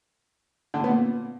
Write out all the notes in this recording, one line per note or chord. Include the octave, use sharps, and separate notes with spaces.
D3
A2
B3
A#2